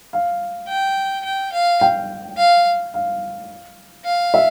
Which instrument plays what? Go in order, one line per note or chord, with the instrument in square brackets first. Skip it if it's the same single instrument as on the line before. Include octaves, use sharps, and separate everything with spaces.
[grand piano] F5
[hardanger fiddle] G5
G5
F5
[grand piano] G5
[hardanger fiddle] F5
[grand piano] F5
[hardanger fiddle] F5
[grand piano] E5